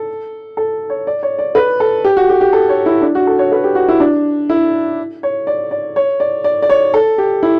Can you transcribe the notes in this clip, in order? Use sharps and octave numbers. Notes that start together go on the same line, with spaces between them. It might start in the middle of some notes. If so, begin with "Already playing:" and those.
Already playing: A4
A4
C#5
D5
C#5
D5
B4
A4
G4
F#4
G4
G4
A4
C#5
E4
D4
F#4
A4
C#5
B4
G4
F#4
E4
D4
E4
C#5
D5
D5
C#5
D5
D5
D5
C#5
A4
G4
E4